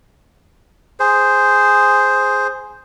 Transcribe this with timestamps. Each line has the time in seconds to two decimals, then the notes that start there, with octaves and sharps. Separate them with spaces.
1.00 G#4 C5